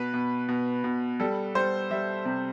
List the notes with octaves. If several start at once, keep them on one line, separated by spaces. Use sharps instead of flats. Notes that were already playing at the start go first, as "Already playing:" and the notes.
Already playing: B2 B4
B2
B2
B2
G3 A4
G3 C5
G3 E5
C3